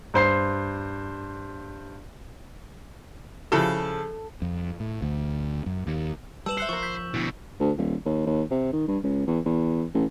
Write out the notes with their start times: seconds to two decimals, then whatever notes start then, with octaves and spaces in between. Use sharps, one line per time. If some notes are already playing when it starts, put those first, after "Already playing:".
0.14 G2 C5 C7
3.52 C#3 F3 E4 A4
4.42 F2
4.80 A2
5.02 D2
5.66 F#2
5.87 D#2
6.46 G3 B4 A5 E6 E7 F#7
6.58 C5 E5 F#6 C#7
6.69 F3 A#4 C#6
6.83 G6 B6
7.14 B2 D3 E4
7.60 D2
7.78 D#1
8.05 D#2
8.26 D#2
8.51 C3
8.73 D#3
8.88 G2
9.03 C#2
9.27 E2
9.45 E2
9.95 A1